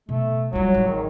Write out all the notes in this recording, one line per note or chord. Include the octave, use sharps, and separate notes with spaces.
B2 A3
F#3 G3 F4
G#1
D#3